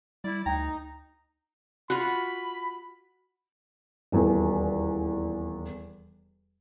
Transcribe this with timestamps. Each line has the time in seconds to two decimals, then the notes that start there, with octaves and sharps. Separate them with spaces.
0.24 G3 E4 D5
0.46 D2 D#4 G5 A#5
1.90 F4 F#4 B5
4.12 D#1 E2